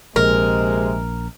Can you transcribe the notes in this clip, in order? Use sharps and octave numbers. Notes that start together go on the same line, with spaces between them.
A#1 C3 G#3 A#4